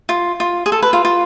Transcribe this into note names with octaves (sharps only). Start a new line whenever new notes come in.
F4
F4
G#4
A4
B4
F4
F4